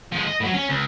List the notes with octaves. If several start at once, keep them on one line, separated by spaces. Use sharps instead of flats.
F3 G#3
D#5
A2 F#3
C#4
C#2